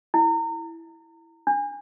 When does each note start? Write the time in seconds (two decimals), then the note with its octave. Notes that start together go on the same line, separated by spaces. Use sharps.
0.14 E4
1.47 D4